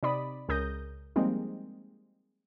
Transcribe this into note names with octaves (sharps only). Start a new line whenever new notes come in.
C3 D#4 D5 B5 D#6
C#2 C#3 A#4 D#6 G6 A#6
F3 G3 G#3 A#3 C4 D#4